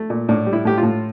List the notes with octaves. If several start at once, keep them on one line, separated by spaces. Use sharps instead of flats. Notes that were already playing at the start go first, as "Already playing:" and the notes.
Already playing: A3
A#2
A2 D4
G3
E4
A2 G4
F4
A2